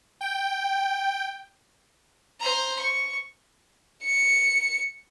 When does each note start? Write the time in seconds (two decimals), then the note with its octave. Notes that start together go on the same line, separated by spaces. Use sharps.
0.21 G5
2.40 C5 A#5
2.79 C#6
4.04 C#7